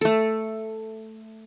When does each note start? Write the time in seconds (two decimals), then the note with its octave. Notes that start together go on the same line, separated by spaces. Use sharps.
0.01 A3 A4